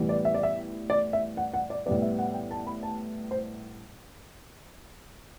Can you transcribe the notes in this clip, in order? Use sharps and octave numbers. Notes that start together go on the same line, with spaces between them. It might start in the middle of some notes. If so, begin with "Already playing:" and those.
Already playing: A2 E3 G3 B3
D5
E5
D5
E5
D5
E5
F#5
F#5
D5
A2 G3 B3 D5
E5
F#5
G5
A5
B5
A5
C5